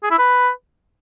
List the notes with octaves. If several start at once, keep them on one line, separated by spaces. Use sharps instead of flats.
G#4
E4
B4